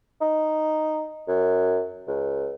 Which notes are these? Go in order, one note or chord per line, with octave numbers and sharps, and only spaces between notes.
D#4
F#2
C#2